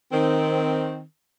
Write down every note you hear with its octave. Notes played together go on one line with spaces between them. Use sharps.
D#3 C4